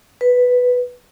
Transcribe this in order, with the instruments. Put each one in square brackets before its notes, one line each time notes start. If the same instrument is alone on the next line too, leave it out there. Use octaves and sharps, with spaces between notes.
[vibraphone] B4